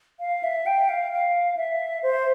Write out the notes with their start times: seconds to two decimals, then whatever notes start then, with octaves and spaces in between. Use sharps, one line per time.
0.20 F5
0.43 E5
0.66 G5
0.89 F5
1.12 F5
1.57 E5
2.03 C5